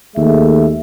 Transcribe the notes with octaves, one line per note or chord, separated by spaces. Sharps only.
D#2 G#3 A3 E5